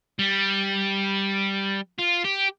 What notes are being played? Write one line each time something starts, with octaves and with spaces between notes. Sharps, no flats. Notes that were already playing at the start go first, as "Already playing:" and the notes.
G3
F4
G4